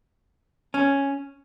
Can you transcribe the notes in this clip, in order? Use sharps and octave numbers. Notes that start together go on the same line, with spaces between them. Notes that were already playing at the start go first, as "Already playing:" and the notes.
C#4